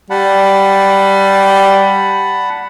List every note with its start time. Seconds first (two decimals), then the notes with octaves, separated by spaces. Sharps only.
0.10 G3 F#5 A5 B5